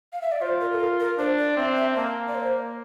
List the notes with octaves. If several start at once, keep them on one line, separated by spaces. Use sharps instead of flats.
F5
E5
D5
F4 C5
A#4
A4
A#4
A#4
D4 C5
D5
C4 E5
E5
A#3 A5
D5
C5